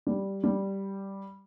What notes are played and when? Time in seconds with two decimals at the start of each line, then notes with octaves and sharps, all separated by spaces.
0.07 G3
0.44 G3